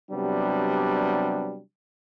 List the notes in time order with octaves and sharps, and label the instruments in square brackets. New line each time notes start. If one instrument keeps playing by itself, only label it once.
[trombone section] C3 F#3 G3 B3 D4